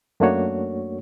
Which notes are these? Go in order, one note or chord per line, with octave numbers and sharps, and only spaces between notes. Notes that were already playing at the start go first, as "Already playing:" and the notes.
F#2 A3 A#3 D4 F#4 C#5